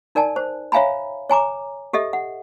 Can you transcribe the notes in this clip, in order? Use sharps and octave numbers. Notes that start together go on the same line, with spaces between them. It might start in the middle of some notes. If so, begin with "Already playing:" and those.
D#4 A#4 D5 G#5 A5
C5
C#5 E5 F5 G#5 A#5 B5
C#5 G#5 A#5 D6
G4 A4 D#5 E5
F#5